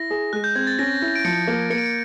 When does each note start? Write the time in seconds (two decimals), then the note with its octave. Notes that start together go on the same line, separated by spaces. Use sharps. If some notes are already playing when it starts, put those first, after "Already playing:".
Already playing: E4 A#6
0.10 G#4
0.33 G#3 F#6
0.44 G6
0.55 C4 G#6
0.67 A6
0.79 C#4 A#6
1.02 E4
1.15 D7
1.25 F3 C#7
1.48 A#3
1.70 A#3 C#7
1.78 D7
1.86 C#7